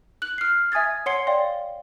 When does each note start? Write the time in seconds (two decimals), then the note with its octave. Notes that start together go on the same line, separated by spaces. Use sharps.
0.22 F#6 F#7
0.38 F6 C7
0.72 E5 G#5 D#6 G#6 A6
1.06 C#5 F#5 C6 C7 C#7 G7
1.27 D5 F5 G5 C6